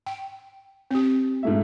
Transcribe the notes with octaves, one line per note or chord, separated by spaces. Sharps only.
G5
C4 G4
G#2 A3 E5